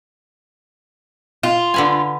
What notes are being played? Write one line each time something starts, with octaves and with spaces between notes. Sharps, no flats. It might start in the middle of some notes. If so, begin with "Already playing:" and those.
F4
D3 B4 G#5